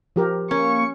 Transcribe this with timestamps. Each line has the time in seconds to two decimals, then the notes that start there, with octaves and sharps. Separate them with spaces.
0.16 F3 G4 A#4
0.51 A#3 C#4 C#6